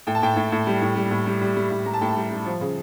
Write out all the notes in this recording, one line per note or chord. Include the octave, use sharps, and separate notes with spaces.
A2 G5
A5
A2 G5
A2
A2
G3
A2
G3
A2
G3
G3
G3
A2
G3 A#5
A5
A2 G5
A5
G3
G3
F3
C#3